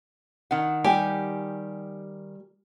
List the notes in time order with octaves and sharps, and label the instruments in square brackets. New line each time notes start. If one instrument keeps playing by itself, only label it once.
[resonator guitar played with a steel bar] D#3 F#5
[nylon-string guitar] G3 G#5 [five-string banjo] G4